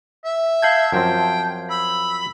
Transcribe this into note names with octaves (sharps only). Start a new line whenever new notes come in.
E5
F5 A5 G6 G#6
F#2 F3 C4 G5
B5 E6